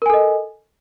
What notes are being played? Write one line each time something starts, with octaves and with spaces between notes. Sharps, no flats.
A4 A#4 D#5 G#5